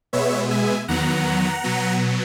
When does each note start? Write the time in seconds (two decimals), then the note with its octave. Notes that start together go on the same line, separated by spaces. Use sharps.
0.13 B2 G#3 B3 C#5 E5
0.51 E5 G#5
0.88 E2 D#3 F#3 B3 F#5 A#5
1.64 B2 F#3 B3